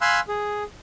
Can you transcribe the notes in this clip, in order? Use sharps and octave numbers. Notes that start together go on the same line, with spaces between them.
F5 G#5 B5 C6 E6 F#6
G#4